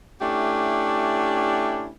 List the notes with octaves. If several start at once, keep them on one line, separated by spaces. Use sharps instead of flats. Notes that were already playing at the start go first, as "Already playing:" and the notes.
A3 C#4 D4 E4 G4